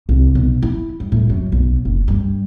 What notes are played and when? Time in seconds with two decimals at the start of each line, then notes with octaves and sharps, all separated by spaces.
0.09 C2
0.35 B1
0.62 E4
1.00 G2
1.12 A2
1.30 F#2
1.52 B1
1.85 F#1
2.08 G2